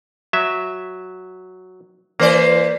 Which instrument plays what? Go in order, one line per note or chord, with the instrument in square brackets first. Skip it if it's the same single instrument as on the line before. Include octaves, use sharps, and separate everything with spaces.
[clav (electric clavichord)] F#3 E5
[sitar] E3 C5 D5 [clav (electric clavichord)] A#3